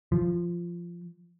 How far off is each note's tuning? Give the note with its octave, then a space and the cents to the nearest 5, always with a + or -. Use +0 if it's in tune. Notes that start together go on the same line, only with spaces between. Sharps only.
F3 -10